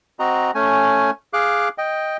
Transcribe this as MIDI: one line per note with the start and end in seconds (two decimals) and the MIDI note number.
0.19 0.51 60
0.19 0.51 66
0.19 0.51 75
0.19 0.51 82
0.55 1.11 57
0.55 1.11 61
0.55 1.11 80
1.33 1.69 68
1.33 1.69 77
1.33 1.69 86
1.33 1.69 90
1.78 2.17 75
1.78 2.17 79